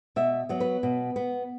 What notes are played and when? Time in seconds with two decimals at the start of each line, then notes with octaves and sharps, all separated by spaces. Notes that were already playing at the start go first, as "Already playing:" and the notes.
0.16 B2 E5
0.49 F#3 B3
0.60 B4
0.83 B2
1.16 B3